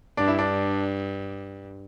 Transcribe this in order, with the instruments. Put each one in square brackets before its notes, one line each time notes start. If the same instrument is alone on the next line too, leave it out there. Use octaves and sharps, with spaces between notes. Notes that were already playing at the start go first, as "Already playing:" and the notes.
[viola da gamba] G2 [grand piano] D4
[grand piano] E4
D4